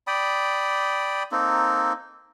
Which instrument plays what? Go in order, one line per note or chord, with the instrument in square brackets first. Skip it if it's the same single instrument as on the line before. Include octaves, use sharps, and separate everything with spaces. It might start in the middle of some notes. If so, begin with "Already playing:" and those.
[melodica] D5 G5 B5 D#6
A#3 C4 D#4 A4